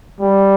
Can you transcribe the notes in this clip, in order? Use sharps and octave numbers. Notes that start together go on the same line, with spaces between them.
G3